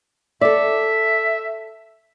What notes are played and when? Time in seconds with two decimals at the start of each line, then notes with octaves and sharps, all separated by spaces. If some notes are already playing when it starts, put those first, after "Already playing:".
0.41 A4 D5 E5